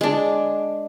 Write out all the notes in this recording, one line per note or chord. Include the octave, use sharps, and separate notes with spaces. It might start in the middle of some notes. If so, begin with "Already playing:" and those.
G#3 D4